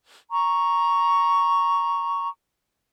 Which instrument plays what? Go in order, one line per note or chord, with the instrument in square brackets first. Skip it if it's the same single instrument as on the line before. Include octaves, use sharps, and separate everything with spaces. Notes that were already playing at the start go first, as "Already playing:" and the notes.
[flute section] A#5 C#6